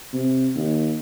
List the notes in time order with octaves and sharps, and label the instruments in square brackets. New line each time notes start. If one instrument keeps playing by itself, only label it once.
[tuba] C3
D#2